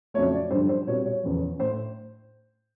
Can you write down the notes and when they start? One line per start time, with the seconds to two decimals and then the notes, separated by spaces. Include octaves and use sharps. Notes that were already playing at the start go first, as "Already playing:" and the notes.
0.14 F2 C#3 F#3 A3 C#5
0.33 D5
0.51 G2 D3 F3 C5
0.69 C5
0.87 B2 G3 C4 C#5
1.05 C#5
1.23 E2 C#3 F3
1.59 A2 C5